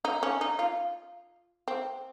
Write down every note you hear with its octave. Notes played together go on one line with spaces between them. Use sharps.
D#4
C#4
D#4
F4
C4